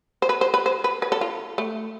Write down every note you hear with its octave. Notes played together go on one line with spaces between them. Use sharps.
C5
B4
C5
B4
C5
B4
B4
A4
F4
A3